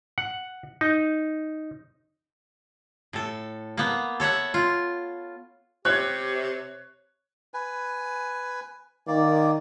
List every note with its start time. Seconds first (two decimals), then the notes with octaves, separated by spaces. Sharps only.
0.18 F#5
0.81 D#4
3.13 A2 A4
3.77 A#3 B3
4.20 A4 C#5 E5 F#5
4.54 F4
5.85 C3 G4 C#5 F#6 G#6
7.54 B4 G#5
9.07 D#3 A#3 D5